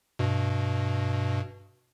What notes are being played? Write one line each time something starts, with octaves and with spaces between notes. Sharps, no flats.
G2 B2